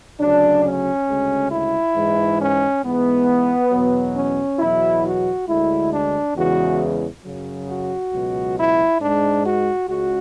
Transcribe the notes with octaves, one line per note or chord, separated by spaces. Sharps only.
D2 C#3 F#3 D4
C#4
D2 C#3 G#3
E4
G#2 E3 G#3
C#4
G#2 E3 G#3 B3
E2 B2 F#3
C#4
E2 B2 F#3 E4
F#4
D2 D3 G#3 E4
D4
E2 C#3 E3 G#3 F#4
F#2 C#3 F#3
F#4
C#2 B2 F#3
E4
G#2 G#3 D4
F#4
C#2 C#3 G#3 F#4